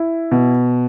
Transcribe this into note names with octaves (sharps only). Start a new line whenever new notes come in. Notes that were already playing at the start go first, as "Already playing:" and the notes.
Already playing: E4
B2